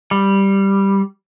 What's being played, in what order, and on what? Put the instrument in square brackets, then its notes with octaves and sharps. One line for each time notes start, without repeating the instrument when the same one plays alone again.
[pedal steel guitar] G3